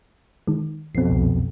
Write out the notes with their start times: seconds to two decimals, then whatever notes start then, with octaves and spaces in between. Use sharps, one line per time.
0.47 D#3 G#3
0.95 A#1 F2 B2 C4 C7
1.11 C2